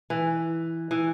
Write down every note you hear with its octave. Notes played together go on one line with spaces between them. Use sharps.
E3
E3